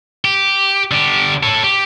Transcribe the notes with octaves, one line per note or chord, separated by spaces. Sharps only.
G4
D3 G4
A4 C#5
G4